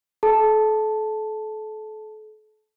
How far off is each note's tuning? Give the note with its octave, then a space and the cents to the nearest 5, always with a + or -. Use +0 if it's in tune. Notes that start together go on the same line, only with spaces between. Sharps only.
A4 -35 A5 +0